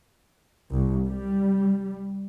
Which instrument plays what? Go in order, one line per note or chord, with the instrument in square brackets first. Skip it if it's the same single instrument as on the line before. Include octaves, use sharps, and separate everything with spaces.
[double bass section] C2
G3